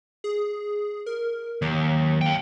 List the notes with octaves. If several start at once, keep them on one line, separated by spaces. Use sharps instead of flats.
G#4
A#4
D#2 F#3
F5 G5